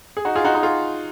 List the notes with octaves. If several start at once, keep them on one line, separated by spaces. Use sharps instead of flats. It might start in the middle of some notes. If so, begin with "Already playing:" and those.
G#4
D#4 F#4
F4 G#4
D#4 F#4
D#4 F#4
F4 G#4